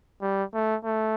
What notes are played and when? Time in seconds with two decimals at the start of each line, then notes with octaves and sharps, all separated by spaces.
0.22 G3
0.54 A3
0.85 A3